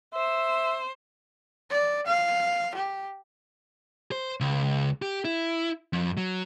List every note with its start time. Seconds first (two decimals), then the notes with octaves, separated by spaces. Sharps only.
0.14 C5 E5
1.71 D5
2.07 F5
2.75 G4
4.12 C5
4.41 C#2
5.02 G4
5.25 E4
5.93 F2
6.17 F#3